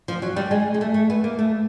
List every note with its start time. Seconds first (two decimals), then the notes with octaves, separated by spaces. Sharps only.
0.08 F3
0.22 F#3
0.36 G3
0.51 G#3
0.74 G#3
0.81 A3
0.94 A3
1.10 B3
1.24 A#3
1.39 A3